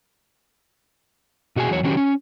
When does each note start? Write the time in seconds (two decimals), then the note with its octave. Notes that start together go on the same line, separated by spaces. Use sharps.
1.56 B2 F#4 G#4 G#5
1.70 E2 F#3 C#5
1.83 D#3 F#3 C#4 F#4 G4
1.97 C#4